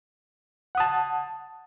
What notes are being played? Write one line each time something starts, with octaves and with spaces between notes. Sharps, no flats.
F#5 A5 D#6